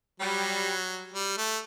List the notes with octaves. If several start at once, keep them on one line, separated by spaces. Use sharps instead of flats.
F#3 G3
G3
A3